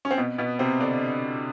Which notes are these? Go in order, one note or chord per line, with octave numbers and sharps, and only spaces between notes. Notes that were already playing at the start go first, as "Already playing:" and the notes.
C#4
C4
B2 B3
B2 B3
C3 C4
D3 D4